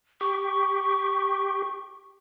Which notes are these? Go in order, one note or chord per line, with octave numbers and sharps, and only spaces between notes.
G4 C#6